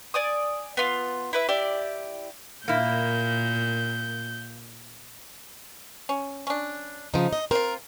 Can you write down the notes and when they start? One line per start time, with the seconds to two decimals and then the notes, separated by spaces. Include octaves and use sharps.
0.14 D5 G#5 D#6
0.77 B3 F4
1.33 E4 B4 E5
1.49 E4 G4 D5
2.68 A#2 A#3 E4 G6
6.09 C#4
6.47 C#4 D4
7.14 C#3 F3 D#4
7.33 D#5
7.51 C4 F4 A#4